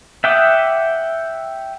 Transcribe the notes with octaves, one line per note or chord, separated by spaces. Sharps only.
E5 F#5 G5 D6 D#6